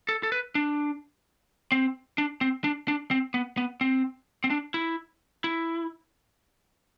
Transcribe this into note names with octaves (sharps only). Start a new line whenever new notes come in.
A4
A4
B4
D4
C4
D4
C4
D4
D4
C4
B3
B3
C4
C4
D4
E4
E4